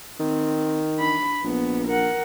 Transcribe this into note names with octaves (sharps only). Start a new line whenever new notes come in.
D#3 C4
D4 B5
A#1 B3
A#4 F#5